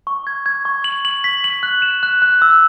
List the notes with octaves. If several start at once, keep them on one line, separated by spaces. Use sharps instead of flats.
C#6
G#6
G#6
C#6
F#7
F#7
B6
F#7
F#6
E7
F#6
F#6
E6